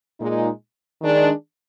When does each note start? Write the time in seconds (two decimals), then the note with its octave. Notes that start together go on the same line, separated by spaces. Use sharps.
0.21 A#2 G#3 D#4
1.01 D#3 G#3 D4